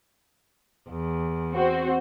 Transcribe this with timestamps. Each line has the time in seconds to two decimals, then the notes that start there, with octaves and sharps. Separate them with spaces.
0.90 E2
1.52 C4 F#4 C5